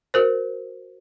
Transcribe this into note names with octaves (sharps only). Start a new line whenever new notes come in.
F#4 A#4 C5